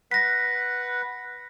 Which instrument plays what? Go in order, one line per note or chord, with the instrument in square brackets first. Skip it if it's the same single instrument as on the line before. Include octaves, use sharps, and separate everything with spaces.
[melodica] B4 F#5 [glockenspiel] A#6 B6